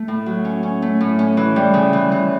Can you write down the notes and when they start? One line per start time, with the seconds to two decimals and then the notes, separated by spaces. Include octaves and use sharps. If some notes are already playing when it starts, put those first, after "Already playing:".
Already playing: A3
0.08 A2
0.26 F#3
0.45 C#4
0.63 C#4
0.82 A3
1.01 A2
1.19 C#4
1.37 E3
1.56 G3
1.74 C#3
1.93 E3
2.12 E3